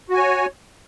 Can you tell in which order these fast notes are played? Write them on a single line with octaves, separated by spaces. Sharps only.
F#4 G#5 C#5